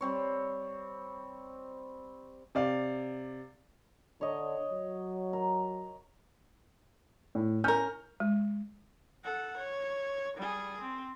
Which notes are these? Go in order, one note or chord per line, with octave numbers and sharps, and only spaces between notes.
G3 C4 C#5
C3 D5 F5
D3 C#5 D#5
F#3
A#4
A2
C#4 A#4 F6 G6
G#3
A4 F#5
C#5
G3 G#4
C4